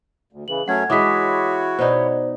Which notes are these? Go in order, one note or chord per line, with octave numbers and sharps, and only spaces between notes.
D2
C#3 E3 F#7
F#2 F#3 A3 C#4 F#5 G#6
E3 G#3 E4 F#4 C#5 D6 D#6 B6
B2 B3 D#4 C5 D5